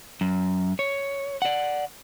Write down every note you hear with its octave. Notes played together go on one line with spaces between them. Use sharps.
F#2
C#5
D5 F#5